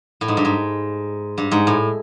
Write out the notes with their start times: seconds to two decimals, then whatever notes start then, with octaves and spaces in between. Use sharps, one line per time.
0.21 A2
0.28 G#2
0.37 G2
0.45 G#2
1.38 G2
1.51 G#2
1.67 A2